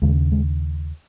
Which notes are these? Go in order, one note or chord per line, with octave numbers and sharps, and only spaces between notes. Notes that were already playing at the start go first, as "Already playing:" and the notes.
D#2 C#3 G#3
G#3